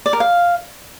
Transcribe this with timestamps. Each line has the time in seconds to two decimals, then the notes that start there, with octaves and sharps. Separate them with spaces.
0.06 D5
0.13 A#4
0.20 F5